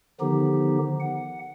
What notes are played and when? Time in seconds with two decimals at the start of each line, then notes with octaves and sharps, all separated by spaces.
0.20 D3 D#3 F3 B3 D#4 G4
1.00 F#5